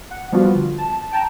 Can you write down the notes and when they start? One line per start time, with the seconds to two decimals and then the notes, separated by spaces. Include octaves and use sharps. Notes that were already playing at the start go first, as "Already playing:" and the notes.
0.11 F#5
0.32 F3 G3 B3 D4 F4 F#4
0.55 D3
0.78 A5
1.12 G5 A5 A#5